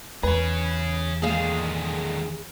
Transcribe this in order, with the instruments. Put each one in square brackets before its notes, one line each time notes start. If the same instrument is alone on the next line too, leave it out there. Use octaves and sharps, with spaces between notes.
[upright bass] E2 [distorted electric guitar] G#4 C#5 [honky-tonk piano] B4
[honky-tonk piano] A#2 G#3 [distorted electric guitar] D3 D#3 [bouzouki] G#4 F5